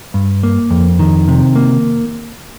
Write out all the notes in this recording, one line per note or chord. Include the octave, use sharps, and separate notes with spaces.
G2
A#3
F2
D#3
C3
A#3